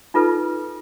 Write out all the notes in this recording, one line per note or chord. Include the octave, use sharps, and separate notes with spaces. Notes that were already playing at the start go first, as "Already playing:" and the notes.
D#4 F4 A4 B4